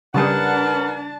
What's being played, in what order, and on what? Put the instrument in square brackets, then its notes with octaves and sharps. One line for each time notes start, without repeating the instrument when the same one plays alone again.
[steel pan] C#3 G3 G#4 [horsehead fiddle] D4 A5 [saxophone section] A#4 B4 F#5